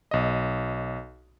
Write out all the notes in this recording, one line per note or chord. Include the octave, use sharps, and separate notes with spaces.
B1 D#5